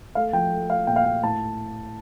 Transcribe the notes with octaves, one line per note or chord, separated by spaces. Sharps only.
A3 F5
F3 G5
A3
A3 F5
A#2 G5
F5
A#2 G5
A2 A5